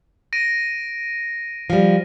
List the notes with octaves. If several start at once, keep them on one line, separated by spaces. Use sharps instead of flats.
A#6 D7 D#7
F3 G3